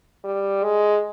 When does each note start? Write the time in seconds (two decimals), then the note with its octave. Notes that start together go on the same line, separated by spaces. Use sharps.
0.24 G3
0.63 G#3